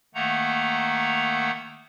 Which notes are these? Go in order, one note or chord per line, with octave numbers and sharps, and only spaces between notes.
D#3 A3 A#3 F#5 A#5